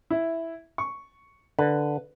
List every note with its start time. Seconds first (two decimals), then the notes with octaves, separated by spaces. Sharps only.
0.10 E4 E5
0.78 C#6
1.59 D3 B4